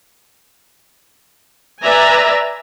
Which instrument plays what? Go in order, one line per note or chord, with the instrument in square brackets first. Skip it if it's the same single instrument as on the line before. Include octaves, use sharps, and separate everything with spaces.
[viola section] B4 D5 E5 G#5 A#5